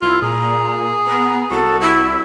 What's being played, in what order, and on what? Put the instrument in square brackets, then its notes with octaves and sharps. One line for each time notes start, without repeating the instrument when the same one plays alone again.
[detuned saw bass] C2 [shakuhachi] E4 [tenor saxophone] F4
[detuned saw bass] A#2 [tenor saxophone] G#4 [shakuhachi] A#5
[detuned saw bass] B3 [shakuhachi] A#5
[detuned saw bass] C2 [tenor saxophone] F#4 [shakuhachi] A4
[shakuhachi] E4